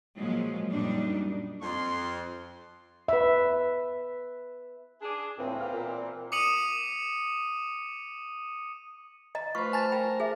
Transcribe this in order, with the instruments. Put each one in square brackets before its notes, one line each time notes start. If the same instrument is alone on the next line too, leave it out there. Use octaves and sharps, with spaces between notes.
[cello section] A#2 F3 F#3 G#3
F#2 A#2 G3 D4 D#4
[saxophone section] F2 [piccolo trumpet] C6
[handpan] B4 E5
[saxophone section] D4 G#4
[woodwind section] C#2 A2 [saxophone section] E3 A#3 C4
[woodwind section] B3 F5 F6
A#2
[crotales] D6 D#6 C#7 D#7 F#7
[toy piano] D#5 A#5
[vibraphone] A3 C5 [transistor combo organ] F4 B4 [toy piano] C#6
[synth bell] G#5 A5 A6
[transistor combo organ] A#4 [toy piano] G5
[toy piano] G#4 E5